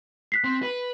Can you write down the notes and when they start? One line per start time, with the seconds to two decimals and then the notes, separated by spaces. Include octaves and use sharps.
0.32 F#6 B6 C7
0.44 C4
0.63 B4